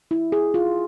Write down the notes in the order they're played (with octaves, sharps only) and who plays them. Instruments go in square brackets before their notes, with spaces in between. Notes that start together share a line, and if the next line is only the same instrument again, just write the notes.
[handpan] E4
G#4
F4